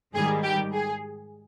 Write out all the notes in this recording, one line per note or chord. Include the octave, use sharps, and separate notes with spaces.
G#2 D#3 G3 G#4
G4
G#4